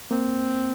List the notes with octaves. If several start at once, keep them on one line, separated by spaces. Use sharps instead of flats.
A#3 C4